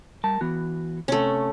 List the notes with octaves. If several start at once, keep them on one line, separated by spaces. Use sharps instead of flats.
G3 A#4 A5
E3 B3 F#4
C3 A3 C#4